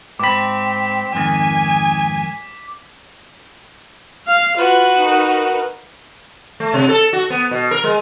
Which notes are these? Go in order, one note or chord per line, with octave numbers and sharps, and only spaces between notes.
G#2 C4 B5 D6 B6
F2 G#2 D#3 G#5
F5
F4 F#4 B4
D#4 A#4
A3
C3
A4
F#4
B3
B2
A#4
G#3